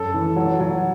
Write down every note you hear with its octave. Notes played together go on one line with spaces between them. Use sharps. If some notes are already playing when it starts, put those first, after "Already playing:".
Already playing: F#2 A4
E3
F#3
F#3